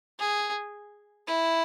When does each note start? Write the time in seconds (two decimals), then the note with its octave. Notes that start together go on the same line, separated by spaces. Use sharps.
0.20 G#4
1.27 E4